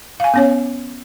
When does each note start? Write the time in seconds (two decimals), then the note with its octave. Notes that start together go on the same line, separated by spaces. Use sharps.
0.20 F5 G#5
0.34 B3 C#4 C#5